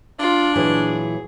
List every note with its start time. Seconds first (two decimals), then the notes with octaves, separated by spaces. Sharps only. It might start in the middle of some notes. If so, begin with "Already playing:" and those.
0.19 D4 F4
0.56 A#2 E3 F#3 G#4